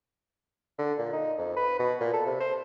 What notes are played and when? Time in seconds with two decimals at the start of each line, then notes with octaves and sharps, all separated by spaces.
0.78 D3
0.98 A#2
1.13 D#4
1.38 F2
1.56 B4
1.79 B2
2.00 A#2
2.13 A4
2.26 C3
2.40 C5